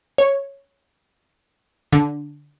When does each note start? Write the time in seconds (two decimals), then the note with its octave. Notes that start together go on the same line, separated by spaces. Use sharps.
0.18 C#5
1.92 D3